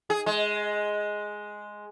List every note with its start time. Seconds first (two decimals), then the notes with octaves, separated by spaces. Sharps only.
0.10 G#4
0.26 G#3